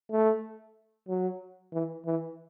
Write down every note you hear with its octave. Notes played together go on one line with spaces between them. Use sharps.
A3
F#3
E3
E3